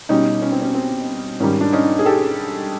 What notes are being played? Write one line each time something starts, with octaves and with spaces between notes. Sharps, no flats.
B2 G3 C#4 D#4
C#4
C4
C#4
C4
G#2 D#3 G3 C#4
D4
C#4 D#4
G#4
G4 A4